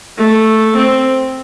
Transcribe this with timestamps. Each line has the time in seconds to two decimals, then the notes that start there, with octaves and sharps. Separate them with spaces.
0.18 A3
0.77 C4